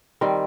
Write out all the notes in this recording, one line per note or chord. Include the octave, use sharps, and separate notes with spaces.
D#3 G3 C4